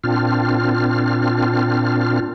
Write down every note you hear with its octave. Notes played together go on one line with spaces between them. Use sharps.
A#2 C4 D4 F4 F6